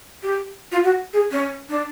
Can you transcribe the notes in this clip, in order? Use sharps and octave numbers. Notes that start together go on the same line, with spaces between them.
G4
F4
F#4
G#4
C#4
D4